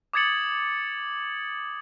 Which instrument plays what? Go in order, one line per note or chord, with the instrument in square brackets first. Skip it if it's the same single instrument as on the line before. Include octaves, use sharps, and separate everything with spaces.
[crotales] D6 D#6 G#6 A6 C#7 F#7